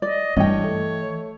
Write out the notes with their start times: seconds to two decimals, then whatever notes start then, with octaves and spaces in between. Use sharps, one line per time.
0.02 D5 D#5
0.37 G2 E3 C#5 D#5 G5
0.64 A3